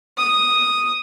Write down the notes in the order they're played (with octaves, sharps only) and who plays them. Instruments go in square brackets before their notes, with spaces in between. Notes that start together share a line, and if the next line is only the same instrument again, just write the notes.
[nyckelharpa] D#6